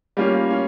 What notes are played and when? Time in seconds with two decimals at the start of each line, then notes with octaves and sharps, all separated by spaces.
0.17 G3 A#3 C#4 F4
0.49 C#4 F4